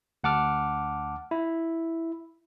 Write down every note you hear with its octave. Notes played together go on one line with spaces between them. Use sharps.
D2 F#5 A5 D6 F6
E4